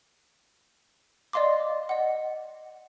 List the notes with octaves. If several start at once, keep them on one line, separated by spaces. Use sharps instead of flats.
D5 D#5 F5 C6 D6
D#5 F#5